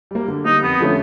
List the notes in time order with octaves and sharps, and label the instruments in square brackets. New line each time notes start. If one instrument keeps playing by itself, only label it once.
[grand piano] G3 A#3
D3
[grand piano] G3 A#3 [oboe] D#4
[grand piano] F2 [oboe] B3
[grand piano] D3 F3 A3 C#4